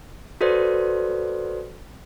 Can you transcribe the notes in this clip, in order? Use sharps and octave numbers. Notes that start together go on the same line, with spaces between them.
F#4 A4 B4 C5 D5